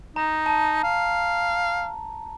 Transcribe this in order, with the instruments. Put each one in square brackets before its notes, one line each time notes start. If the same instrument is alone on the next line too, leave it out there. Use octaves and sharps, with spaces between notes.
[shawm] D#4 [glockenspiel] A#5
[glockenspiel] A5
[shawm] F5